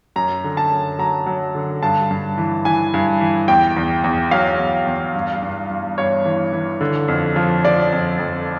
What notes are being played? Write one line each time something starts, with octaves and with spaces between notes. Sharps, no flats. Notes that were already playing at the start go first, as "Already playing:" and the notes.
F#2 A#5
D3
A5
F#2
F#3 A#5
F#3
D3
G2 A5
G2
E3
E3 G#5
G2
E3
E2 G5
E2
E2
F#3 F5
E2
E2
G2
G2
G2
G2 C#5
E3
E3
D3
F2
F3
F3 D5
F2
F2